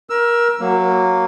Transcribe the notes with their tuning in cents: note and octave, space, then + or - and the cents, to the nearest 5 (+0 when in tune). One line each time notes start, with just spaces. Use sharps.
A#4 +25 E6 +15
F#3 +0 A#3 +0